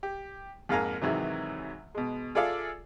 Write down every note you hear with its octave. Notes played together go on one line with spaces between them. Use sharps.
G4
F2 G#2 A#3 F5 G#5 A#5
G#2 C3 D#3 E3 F#3
B2 G#3
F4 G#4 A4 D5 E5 F5